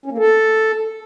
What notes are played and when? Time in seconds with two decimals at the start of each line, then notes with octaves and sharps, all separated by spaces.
0.06 C#4
0.12 A#3
0.18 A4